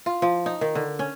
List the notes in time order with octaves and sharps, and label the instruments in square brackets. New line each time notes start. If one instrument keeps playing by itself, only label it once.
[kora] F4
F3
D#4
D#3
D3
C#4